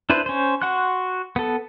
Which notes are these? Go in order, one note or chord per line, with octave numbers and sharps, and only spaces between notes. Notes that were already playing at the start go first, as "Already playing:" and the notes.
D4 E4 B4 C5
C#4 C5
F#4 F#5 C6 F#6
B3 A4